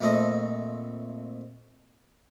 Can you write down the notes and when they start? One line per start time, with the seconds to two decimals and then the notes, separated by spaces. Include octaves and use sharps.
0.01 A#1 F2 A3 C4 A4 D#5